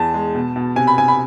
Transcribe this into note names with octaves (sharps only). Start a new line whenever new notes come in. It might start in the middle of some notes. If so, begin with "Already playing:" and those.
Already playing: E2 A5
G#3
B2
B2
C3 G#5
B5
C3 G#5
B5